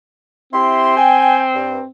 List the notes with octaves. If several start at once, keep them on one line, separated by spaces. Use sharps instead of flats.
C4 E4 G4 C6
G5 G#5
G2